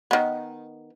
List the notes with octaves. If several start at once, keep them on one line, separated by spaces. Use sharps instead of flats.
D#3 B3